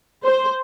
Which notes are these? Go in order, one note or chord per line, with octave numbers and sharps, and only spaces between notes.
C5